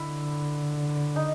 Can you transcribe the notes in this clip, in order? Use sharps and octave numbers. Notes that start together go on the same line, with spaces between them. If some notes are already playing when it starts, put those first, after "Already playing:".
Already playing: D3 E4
D#4